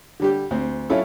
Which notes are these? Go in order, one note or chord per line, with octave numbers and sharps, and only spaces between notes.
D3 G3 G4
D2 C4
F#3 C#4 E4 F4 A4